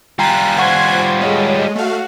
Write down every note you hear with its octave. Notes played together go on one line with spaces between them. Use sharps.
G3 F4 G5 G#5 A#5 F#6
C5 F#5 C6 C#6 G#6
G#3 A4 C#5 D#5
A3 F#4 F5